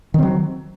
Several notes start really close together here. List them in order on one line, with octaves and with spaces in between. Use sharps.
D#3 C4 F#3